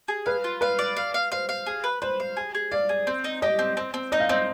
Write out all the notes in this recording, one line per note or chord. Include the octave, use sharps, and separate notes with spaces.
G#4
B4 F5
F4
B4 F5
D5
F5
F5
C5 F5
F5
G#4
B4
B4 C5
F5
G#4
G#4
D5 F5
G#4
C4
D#4
G4 D#5
C4
C4
C4
D#4 D#5
F5
C4 D#5